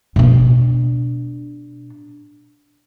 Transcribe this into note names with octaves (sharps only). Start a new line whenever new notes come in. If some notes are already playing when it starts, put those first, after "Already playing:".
B2 D4